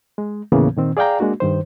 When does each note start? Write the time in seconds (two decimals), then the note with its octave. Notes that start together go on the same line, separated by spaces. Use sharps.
0.18 G#3
0.52 D#2 A2 C#3 E3 A#3 B3
0.77 A#2 D#3 C4
0.97 G#4 D5 F5 G5 A#5
1.20 G#3 A#3 D4 F#4
1.40 G2 D#3 C5